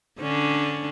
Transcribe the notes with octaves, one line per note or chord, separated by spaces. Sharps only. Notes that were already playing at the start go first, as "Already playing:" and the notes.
D3 C#4 D4